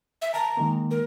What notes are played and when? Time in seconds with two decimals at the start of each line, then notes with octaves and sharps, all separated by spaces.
0.22 E5
0.34 A5 A#5
0.57 D#3 G#3 A#3
0.91 A#4